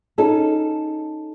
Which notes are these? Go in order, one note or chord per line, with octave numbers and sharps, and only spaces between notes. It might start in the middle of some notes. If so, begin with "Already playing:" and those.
C#4 D#4 A4